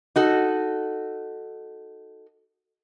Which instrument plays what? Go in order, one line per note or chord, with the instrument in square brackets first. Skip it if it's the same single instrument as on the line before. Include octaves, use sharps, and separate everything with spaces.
[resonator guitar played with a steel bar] D#4 F#4 A4